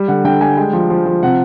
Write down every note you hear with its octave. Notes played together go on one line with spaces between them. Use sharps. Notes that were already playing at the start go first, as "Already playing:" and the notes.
Already playing: G3
D3 F#5
D3 G5
G3 G#5
G#3 G5
F3
F3
F3
C3 F#5